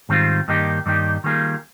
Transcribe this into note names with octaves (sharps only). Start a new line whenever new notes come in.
G#2 D#3 G3 C4 F4
G2 D#3 A#3 D#4 G4
G2 D#3 A#3 D#4 G4
D#3 G3 A#3 F4 G#4